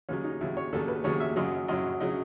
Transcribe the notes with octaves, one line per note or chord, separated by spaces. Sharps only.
D#2 C#3 F#3 C#4
D#4
D#2 C#3 F#3 E4
C#5
D#2 C#3 F#3 A4
B4
D#2 C#3 F#3 C#5
E5
F#2 C#3 F#3 D#5
F#2 C#3 F#3 D#5
C#3 F#3 D#5